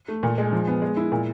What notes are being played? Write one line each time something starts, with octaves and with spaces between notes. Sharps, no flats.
A3
A#2
G#3
F3
B3
G#3
E4
A#2